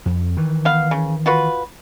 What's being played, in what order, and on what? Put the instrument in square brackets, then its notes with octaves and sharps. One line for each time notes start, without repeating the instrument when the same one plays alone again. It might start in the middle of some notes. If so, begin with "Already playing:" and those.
[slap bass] F2
D#3 E3
[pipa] B3 F5
C#3
F4 F#4 B4